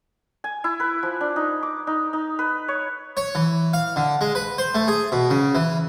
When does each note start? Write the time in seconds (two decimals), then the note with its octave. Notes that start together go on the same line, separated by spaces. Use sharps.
0.44 G#5
0.64 E4
0.80 B4
1.03 F3
1.21 D4
1.36 D#4
1.63 D6
1.87 D#4
2.13 D#4
2.39 B4
2.68 C#5
3.17 C#5
3.35 E3
3.74 F5
3.96 D3
4.21 G#3
4.35 B4
4.58 C5
4.75 A3
4.88 G#4
5.12 B2
5.30 C#3
5.55 E3